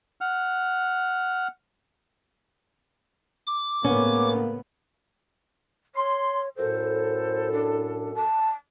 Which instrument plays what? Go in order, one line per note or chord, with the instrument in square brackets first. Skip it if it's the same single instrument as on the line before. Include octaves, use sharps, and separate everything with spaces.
[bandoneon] F#5 F6
[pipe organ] D6
[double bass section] A2 C#3 B3 [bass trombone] A#3 [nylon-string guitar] C#4
[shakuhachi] C#5 [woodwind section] C6
[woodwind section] F#2 A2 A4 [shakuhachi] C5
[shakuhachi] D4
A5